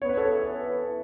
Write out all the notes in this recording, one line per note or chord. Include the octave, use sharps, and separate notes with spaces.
B3 C#5
B4
A4 C#5
E3
E3